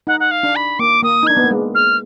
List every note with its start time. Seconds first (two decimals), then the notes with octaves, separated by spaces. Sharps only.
0.07 D#4 F#5
0.20 F#5
0.31 F5
0.43 D4
0.56 B5
0.79 A#3 D6
1.03 A#3 D#6
1.23 D#4
1.27 D4 G#6
1.37 B3
1.44 A#3
1.51 G#3
1.75 F6